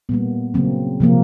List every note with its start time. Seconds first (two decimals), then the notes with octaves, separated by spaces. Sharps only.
0.09 A#2 G3 A#3 B3
0.54 C#3 F#3 A#3 C4
1.00 C3 F3 A#3